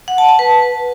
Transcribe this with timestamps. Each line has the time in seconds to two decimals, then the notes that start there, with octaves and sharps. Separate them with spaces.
0.08 F#5
0.18 A5
0.29 A5
0.39 B4